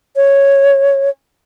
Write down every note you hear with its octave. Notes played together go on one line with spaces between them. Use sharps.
C#5